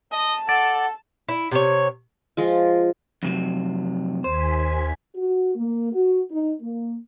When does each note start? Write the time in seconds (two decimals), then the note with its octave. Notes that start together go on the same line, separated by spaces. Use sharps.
0.12 D#5 A5
0.49 A4 D5 F#5
1.29 E4
1.51 C3 C#5
2.37 F3 G#3 F4
3.23 F2 C3 F#3
4.24 D#2 C5 G#5 B6
5.15 F#4
5.55 A#3
5.92 F#4
6.31 D#4
6.61 A#3